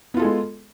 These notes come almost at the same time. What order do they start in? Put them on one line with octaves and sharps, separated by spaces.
B3 F4 A4 G#4 G#3